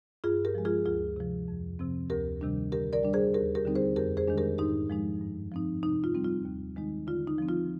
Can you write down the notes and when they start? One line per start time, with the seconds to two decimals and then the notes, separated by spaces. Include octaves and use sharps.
0.24 G2 F4 G#4
0.45 G4 A#4
0.55 F3 G#3
0.65 F4 G#4
0.85 D2 F4 G#4
1.16 C3 F3
1.48 F2
1.79 C3 F3 C4
2.10 D2 G4 A#4
2.41 C3 D#3 G3 D4
2.72 D3 G4 A#4
2.93 A#4 D5
3.03 G3 D4
3.13 G#4 C5
3.34 D#2 G4 A#4
3.55 G4 A#4
3.65 D3 G3 C4 D#4
3.75 G#4 C5
3.96 F2 G4 A#4
4.17 G#4 C5
4.28 D#3 G#3 D4
4.38 G4 A#4
4.58 G#2 D#4 G4
4.90 F3 G#3 D#4
5.21 G2
5.52 F3 C4 D#4
5.83 C3 D#4
6.04 F4
6.14 G3 C4 D#4
6.24 F4
6.45 D#2
6.76 D#3 G#3 D#4
7.07 D3 F4
7.27 D#4
7.38 F3 C4
7.49 F4